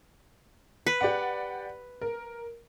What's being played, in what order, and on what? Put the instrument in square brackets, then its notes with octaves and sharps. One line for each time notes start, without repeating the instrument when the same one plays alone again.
[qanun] B4
[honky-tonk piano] G4 D5 F#5
A#4